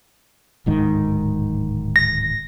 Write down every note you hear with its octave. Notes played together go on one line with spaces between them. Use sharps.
D1 G#2 D#3
A#6